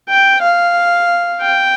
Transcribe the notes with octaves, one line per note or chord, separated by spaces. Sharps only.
G5
F5
G5